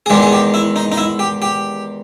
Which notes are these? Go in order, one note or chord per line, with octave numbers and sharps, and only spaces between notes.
G#4
E2 D#3 G#3 G4
G#4
G4
E4
D#4
D#4
E4
G4
G4